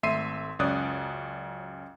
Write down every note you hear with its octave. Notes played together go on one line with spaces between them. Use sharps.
G#1 A3 E5 C6 C7 D#7
C#2 F#2 C#5 D5 D#6 F#6